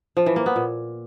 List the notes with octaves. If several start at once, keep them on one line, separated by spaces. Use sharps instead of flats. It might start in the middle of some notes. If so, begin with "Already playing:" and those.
F3
E3
A#3
B3
A#2